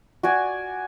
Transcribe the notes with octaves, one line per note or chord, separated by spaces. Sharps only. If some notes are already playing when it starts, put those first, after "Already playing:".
F#4 D5 G#5